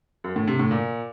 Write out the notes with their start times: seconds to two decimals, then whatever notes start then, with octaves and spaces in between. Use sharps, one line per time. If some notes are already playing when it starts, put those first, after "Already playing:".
0.24 F#2
0.36 A2
0.47 C3
0.59 A2
0.71 A#2